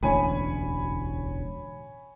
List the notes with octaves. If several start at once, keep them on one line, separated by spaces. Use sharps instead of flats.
E1 A1 D2 C#5 G#5 B5